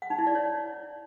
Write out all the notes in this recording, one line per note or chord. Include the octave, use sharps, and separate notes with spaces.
F#5
D#4
E4
D5
C#5